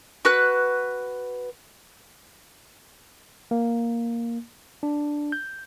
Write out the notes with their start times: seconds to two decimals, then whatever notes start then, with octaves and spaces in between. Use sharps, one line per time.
0.25 F#4 B4 F#6
3.51 A#3
4.83 D4
5.32 G6